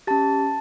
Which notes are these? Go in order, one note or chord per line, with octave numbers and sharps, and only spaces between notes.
C#4 G4 A5 A6